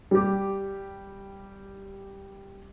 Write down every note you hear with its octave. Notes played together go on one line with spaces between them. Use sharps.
G3 G4